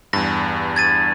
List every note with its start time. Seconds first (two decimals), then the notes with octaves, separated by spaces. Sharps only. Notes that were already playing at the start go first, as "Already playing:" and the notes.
0.13 E2 G2 A#6
0.76 G#6 A6 D#7